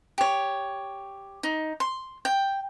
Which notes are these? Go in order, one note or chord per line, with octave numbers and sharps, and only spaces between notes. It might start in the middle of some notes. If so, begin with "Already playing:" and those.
G4 C#5
D#4
C6
G5